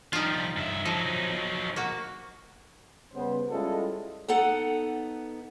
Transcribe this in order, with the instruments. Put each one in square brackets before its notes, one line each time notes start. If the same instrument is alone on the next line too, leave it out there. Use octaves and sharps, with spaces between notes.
[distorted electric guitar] F3 G3 [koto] D#4 F4
[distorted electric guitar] G2 E5
[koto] F3 [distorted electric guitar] F#3 D#4
[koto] A#3 F#4
[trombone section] C#3 G3 B3 C#4 B4 C5
G3 G#3 C#4 E4 F4 A4
[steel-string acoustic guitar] B3 D#4 A4 F#5